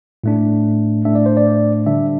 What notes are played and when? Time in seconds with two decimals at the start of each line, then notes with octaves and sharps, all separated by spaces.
0.24 A2 A3 D4
1.05 A2 A3 D4 E5
1.15 D5
1.26 C5
1.37 D5
1.86 D3 G3 D4 E5